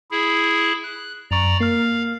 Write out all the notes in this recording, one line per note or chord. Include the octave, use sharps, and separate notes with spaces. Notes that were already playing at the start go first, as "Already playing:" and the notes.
E4 G#4
F#6
F#2 D5 A#5 C#6
A#3 F5 F6